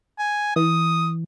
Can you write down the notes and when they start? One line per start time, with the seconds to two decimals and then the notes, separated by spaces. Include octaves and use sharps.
0.19 G#5
0.56 E3 D#6